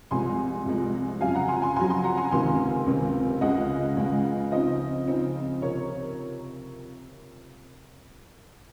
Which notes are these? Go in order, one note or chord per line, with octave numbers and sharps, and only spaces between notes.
C2 C3 F3 G#3 G#5 C6
C2 C3 F3 G#3
F2 C#3 F#3 F5 G#5
F#5 A#5
G#5 C6
G#5 C6
F2 C#3 F#3 G#5 C6
G#5 C6
F#5 A#5
G#5 C6
C#2 C3 D#3 G#5 C6
C#2 C3 D#3
C#2 C#3 G#3 D#5 F#5
C#2 C#3 G#3
C#3 F3 C4 D#4 C5 D#5
C#3 F3 C4 D#4
C3 F3 A#4 C#5